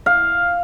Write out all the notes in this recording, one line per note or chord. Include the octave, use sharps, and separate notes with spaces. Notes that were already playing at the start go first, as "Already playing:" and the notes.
F5